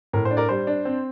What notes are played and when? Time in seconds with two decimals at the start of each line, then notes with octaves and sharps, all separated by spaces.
0.13 A2 A#4
0.25 C5
0.31 D4
0.37 A#4 D5
0.49 G3 C5
0.67 D4
0.85 C4